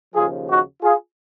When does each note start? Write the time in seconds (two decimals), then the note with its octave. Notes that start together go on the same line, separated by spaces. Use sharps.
0.14 D#2 C#3 F3 F4 G#4
0.49 D#4 F#4
0.82 F4 G#4